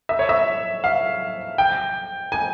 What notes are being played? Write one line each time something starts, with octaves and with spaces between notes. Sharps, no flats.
E5
C#5
E5
F5
G5
G#5